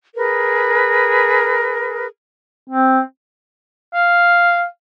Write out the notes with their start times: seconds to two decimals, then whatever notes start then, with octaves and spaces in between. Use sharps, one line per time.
0.16 G#4 A#4 B4
2.67 C4
3.94 F5